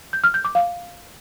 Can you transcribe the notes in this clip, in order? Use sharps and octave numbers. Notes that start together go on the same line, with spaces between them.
G6
F6
G6
D6
F5